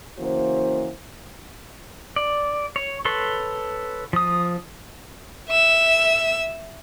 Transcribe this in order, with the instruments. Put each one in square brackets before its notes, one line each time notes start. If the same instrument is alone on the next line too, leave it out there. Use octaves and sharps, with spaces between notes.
[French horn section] C#3 E3 A#3 F#4 C5
[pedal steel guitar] D5
C#5
A4 B4 C#5 C6
F3 D#6
[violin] E5 E6